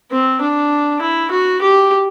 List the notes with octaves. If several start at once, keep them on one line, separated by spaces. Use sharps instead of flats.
C4
D4
E4
F#4
G4